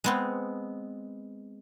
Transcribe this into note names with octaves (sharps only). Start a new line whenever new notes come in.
G#3 B3 C4